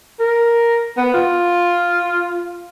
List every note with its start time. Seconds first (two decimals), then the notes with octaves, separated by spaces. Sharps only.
0.20 A#4
0.97 B3
1.14 F4